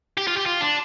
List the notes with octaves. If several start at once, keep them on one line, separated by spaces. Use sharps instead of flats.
G4
F4
G4
F4
D4